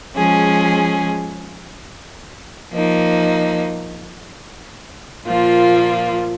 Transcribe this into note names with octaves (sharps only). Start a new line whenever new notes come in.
F3 G#3 C#4 G#4
F3 A#3 D#4
A#2 F3 A#3 F4